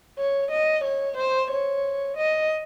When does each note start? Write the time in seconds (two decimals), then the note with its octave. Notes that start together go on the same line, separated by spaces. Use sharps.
0.19 C#5
0.51 D#5
0.85 C#5
1.17 C5
1.51 C#5
2.17 D#5